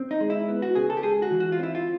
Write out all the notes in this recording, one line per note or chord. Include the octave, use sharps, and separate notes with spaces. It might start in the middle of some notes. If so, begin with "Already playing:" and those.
Already playing: C4
D#4
G#3
E4
B3
F#4
C#3 G#4
A4
G4
G#3 G#4
F#4
E3
F#4
F4
C4 E4
F4